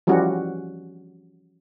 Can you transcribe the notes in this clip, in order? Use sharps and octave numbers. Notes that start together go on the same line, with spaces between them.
E3 F3 G3 C#4 F#4